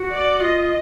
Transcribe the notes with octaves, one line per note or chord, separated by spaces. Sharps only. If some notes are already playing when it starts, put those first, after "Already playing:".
Already playing: F#4
D5
F4 D#5